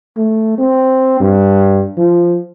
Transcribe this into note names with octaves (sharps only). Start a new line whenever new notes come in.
A3
C4
G2
F3